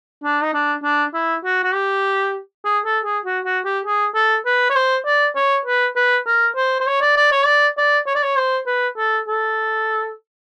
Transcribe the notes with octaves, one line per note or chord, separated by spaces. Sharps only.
D4
D#4
D4
D4
E4
F#4
F#4
G4
G#4
A4
G#4
F#4
F#4
G4
G#4
A4
B4
C#5
C5
D5
C#5
B4
B4
A#4
C5
C5
C#5
D5
D5
C#5
D5
D5
C#5
D5
C#5
C5
B4
A4
A4